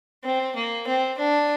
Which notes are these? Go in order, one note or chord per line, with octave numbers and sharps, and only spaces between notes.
C4
A#3
C4
D4